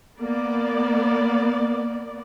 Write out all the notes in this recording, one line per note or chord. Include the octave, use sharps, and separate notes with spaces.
A#3 B3 D5